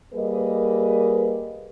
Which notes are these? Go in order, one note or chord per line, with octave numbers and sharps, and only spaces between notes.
G3 A#3 G#4 A#4 B4 D#5